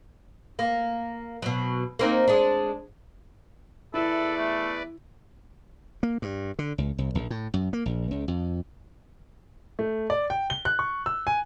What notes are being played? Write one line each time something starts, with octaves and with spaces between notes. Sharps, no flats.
A#3
B2 F#3
A#3 C4 D#4
G#3 D4
E2 E4 A4 B4 D5 E5
A3
A#3
G2
D3
C#2
C2
A#1
A2
F#2
A#3
A#1
C#2
F2
A3
D5
G5
G7
F#6
C#6
E6
G#5